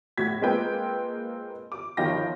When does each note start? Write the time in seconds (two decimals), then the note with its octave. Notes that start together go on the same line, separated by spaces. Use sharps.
0.17 F1 A2 F#4 G#6 B6
0.42 G#3 A#3 C4 F4 B4 G5
1.72 D6
1.97 G1 D#3 F3 F5 G5 A#6